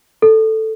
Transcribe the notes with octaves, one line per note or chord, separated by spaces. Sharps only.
A4